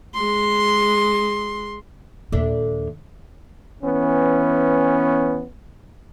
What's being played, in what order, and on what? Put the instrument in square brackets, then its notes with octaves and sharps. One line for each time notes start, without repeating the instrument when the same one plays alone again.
[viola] G#3 C6
[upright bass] D#2 A#2 [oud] D4 A4 E5
[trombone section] E3 B3 C#4